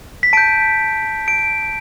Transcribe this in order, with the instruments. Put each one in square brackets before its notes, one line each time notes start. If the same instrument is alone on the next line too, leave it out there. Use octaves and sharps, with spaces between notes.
[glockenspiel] B6
A5 G6 D7
D7